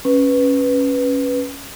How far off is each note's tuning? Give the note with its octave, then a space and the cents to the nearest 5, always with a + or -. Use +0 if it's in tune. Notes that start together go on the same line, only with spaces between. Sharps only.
C#4 -5 B4 +0